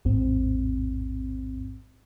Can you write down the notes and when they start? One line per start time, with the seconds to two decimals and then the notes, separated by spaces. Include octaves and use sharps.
0.05 A1 E2 G#2 C4